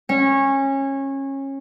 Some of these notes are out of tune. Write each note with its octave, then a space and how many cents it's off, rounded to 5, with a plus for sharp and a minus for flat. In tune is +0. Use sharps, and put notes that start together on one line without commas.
C#4 -25 C#5 -20